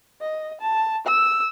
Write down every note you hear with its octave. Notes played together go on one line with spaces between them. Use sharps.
D#5
A5
E6